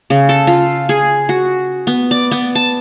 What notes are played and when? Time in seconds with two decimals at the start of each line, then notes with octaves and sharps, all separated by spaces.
0.10 C#3
0.29 A4
0.47 F4
0.89 G#4
1.29 F#4
1.87 B3
2.11 D5
2.31 B3
2.55 A5